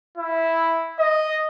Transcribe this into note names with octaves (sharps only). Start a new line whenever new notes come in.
E4
D#5